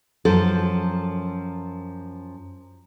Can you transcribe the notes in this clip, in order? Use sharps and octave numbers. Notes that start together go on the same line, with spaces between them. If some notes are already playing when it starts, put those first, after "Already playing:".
F#2 F3 A4